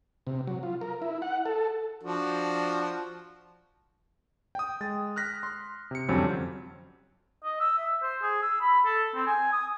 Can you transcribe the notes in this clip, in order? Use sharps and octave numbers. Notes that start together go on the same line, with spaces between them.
C3
F#3
F4
A#4
E4
F#5
A4
F3 D4 F#4
G5 D#6
G#3 A6
F6 F#6 A#6 B6
C6
C3 C#7
F2 D3 F#3 G3 C4 C#4
D#5
E6
E5
C5
G#4
E6
B5
A4
C4
G#5
D#6